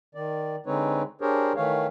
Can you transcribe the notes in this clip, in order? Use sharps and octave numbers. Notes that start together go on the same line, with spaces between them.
D#3 D5
D3 G#3 C4 D#4 B4 C#5
D4 G4 G#4 A#4 C5 C#5
D#3 E3 A3 C#5 F5